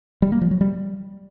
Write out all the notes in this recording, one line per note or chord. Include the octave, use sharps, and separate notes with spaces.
G3
A#3
F3
F#3
G3